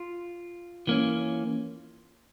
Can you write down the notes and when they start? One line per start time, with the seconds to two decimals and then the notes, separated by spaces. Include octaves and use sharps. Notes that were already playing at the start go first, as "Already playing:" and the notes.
Already playing: F4
0.87 E3 A#3 C#4